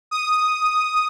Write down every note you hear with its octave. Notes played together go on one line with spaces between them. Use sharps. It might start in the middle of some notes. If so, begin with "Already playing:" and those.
D#6